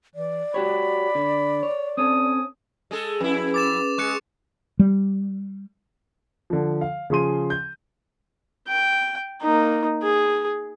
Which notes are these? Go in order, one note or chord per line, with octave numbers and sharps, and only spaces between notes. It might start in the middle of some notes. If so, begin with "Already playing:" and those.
E3 D5
F#4 G4 C#5 B5
D3
C#5
C4 C#4 A4 D#6
G#3 G#4 A4
F2 C#4 E4 G#4 B4
D6 A6 E7
G#3 C#6 F#6 C#7
G3
D3 F3
F5
C#3 F3 G#4 C6 D#7
G6
G5
A#3 D#4
G#4